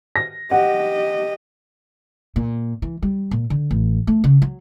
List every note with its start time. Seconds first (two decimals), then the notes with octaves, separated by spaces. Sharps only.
0.16 A#6
0.51 G4 D#5 F#5
2.36 A#2
2.82 E3
3.03 G3
3.31 A#2
3.50 D3
3.71 A1
4.07 A3
4.24 C#3
4.42 F#3